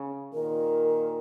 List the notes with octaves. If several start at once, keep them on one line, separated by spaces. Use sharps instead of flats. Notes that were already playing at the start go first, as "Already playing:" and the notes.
Already playing: C#3
A#2 D#3 A#4